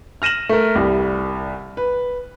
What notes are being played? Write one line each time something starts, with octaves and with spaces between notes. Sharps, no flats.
F6 A#6 D#7 E7 F#7
A3 A#4
C2 G3
B4